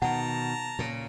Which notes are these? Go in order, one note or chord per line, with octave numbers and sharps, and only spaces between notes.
B2 D#3 F#5 A5 A#5
A#2 C#3